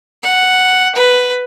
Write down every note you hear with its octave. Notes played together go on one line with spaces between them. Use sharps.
F#5
B4